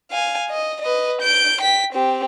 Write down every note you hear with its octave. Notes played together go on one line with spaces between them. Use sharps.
F5 G#5
D#5
B4 D#5
G6 D7
G5 B6
C4 G4